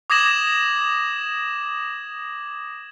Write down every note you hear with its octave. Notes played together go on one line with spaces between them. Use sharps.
D6 D#6 G#6 A#6 E7 F#7